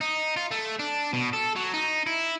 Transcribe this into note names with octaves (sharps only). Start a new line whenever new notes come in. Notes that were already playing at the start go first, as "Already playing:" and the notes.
D#4
F4
A3
D4
B2
A4
F#3
D#4
E4